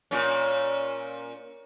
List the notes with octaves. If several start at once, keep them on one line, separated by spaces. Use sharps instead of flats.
A#2 C#4